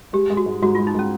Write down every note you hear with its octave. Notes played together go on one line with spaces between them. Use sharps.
G#3 G4
G#3
F#4
G#2
G#2 F#4
G#3 F4
D#4
G#3 C#4